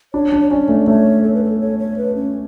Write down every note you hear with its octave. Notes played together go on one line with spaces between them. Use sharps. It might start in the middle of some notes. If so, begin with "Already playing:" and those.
D4 C#5
D4
C#5
C#4 D5
A3
D5
A3 C#5
A4
B4
A4
C#5
C#5
B4
C#4